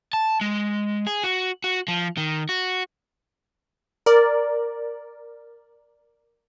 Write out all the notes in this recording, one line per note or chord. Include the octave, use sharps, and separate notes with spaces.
A5
G#3
G#4
F#4
F#4
F3
D#3
F#4
A#4 D5